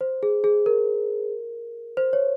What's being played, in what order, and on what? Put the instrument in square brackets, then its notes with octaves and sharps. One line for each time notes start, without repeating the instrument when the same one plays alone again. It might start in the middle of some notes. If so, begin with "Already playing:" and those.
[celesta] C5
G#4
G#4
A#4
C5
C#5